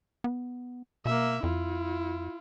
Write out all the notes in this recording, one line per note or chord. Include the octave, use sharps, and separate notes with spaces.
B3
B2 A#3 E5
F2 E4 F4